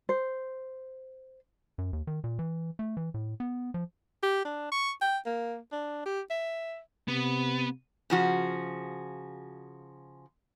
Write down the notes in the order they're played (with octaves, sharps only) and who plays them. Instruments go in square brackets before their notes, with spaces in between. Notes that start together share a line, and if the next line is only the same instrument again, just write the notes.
[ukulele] C5
[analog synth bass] F#2
D#2
D#3
A#2
E3
A3
E3
A2
B3
F3
[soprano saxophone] G4
D4
C#6
G5
A#3
D4
G4
E5
[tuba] C3 [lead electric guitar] B3
[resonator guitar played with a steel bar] C#3 F3 F#4